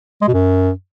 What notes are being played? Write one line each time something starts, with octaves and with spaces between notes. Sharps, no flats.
G#3
B2
F#2